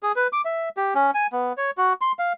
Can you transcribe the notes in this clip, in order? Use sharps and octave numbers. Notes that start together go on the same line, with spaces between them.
G#4
B4
D6
E5
G4
C#4
G#5
B3
C#5
F#4
C6
F5